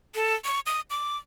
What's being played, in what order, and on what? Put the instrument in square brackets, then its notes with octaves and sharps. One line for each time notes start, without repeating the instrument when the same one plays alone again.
[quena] A4
C#6
D#6
D6